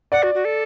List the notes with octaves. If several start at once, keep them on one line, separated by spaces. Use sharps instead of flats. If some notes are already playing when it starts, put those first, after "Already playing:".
D5 F#5
F#4
F#4
A4